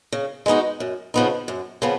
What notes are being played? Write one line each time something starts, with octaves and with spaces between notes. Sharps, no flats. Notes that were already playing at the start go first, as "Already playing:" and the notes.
C#3
G#3 B3 D#4 F#4
F#2
C#3 F3 B3 D#4
F#2
C#3 F3 B3